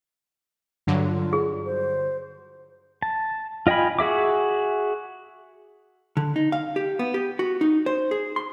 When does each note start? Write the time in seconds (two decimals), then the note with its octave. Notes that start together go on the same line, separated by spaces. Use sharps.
0.87 G2 D3 F#3
1.07 F4
1.33 G#4
1.66 C5
3.02 A5
3.67 F4 D#5 G5 G#5 B5
3.99 F#4 G#4 E5 D6
6.17 D3
6.36 D#4
6.52 F5
6.76 G4
6.99 B3
7.14 G4
7.39 F#4
7.61 D#4
7.86 C5
8.11 G#4
8.36 C6